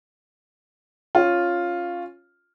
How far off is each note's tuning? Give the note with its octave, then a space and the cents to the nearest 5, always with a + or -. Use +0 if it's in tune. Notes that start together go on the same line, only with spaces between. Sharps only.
C#4 -5 F4 +0